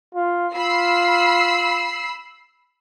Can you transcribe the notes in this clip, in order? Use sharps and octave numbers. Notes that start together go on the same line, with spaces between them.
F4
F4 B5 E6 C7